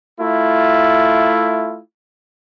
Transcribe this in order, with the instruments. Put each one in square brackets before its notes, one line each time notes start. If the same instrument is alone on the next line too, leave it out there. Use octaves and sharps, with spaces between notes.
[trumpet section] A3 E4 F4